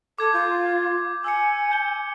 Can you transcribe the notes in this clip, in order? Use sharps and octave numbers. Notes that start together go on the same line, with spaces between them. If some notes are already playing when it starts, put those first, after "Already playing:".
A4 D6 G#6
F4 G6
G#5 E6 C#7
G6 G7